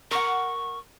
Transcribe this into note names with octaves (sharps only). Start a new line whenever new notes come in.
A#4 F#5 C#6